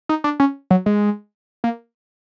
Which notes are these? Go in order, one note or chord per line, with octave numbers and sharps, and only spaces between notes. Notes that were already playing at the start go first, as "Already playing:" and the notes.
D#4
D4
C#4
F#3
G#3
A#3